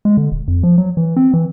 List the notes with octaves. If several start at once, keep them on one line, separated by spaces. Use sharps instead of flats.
G#3
D3
D#1
F2
F3
F#3
E3
C4
E3